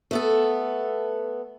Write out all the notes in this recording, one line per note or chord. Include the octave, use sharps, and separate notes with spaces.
A3 B3 A4